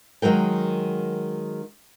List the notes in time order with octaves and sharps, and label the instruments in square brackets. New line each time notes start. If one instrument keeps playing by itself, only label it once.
[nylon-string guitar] D#3 F#3 G#3 A#4 G5